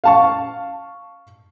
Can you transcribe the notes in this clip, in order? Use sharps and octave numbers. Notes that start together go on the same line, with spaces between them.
F5 A5 C#6